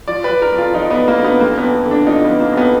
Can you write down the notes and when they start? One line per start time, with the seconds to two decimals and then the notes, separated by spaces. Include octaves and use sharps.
0.08 F3 D5
0.24 B4
0.30 F3
0.42 A#4
0.52 F2
0.58 F4
0.74 F3 D#4
0.91 B3
0.96 F3
1.08 A#3
1.18 D3
1.24 B3
1.40 F2 A#3
1.58 F2 B3
1.86 D3
1.91 D4
2.07 F3 D#4
2.25 B3
2.30 F3
2.40 A#3
2.52 F2
2.57 B3